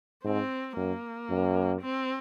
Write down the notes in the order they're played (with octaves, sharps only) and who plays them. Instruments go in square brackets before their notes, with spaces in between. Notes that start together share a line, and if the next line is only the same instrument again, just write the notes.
[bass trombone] G#2 [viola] C4
[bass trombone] F#2 [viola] A#3
[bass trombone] F#2
[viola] C4